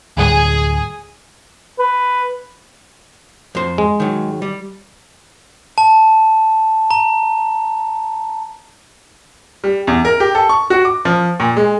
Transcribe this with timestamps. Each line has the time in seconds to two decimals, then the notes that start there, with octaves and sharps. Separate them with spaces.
0.17 D2 A2 G3 G#4
1.79 B4
3.55 F2 C5
3.78 G#3
4.00 D#3 F#3
4.42 G3
5.78 A5
6.91 A#5
9.64 G3
9.87 E2
10.05 A#4
10.20 G4
10.35 A4
10.49 C#6
10.70 F#4
10.85 D6
11.05 F3
11.40 A#2
11.57 G#3